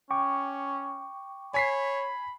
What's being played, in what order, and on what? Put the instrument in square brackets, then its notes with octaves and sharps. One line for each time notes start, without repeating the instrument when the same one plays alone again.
[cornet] C#4 [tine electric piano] G5 C#6 D6
[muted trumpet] C#5 [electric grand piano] G#5 B6 C7 [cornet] B5